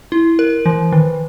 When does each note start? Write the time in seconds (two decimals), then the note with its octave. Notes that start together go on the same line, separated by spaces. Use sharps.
0.12 E4
0.39 A#4
0.66 E3
0.92 D#3